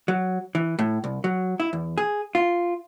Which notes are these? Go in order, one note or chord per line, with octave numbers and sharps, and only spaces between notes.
F#3
E3
A2
C2
F#3
E4
E2
G#4
F4